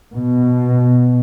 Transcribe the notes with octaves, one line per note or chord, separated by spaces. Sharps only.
B2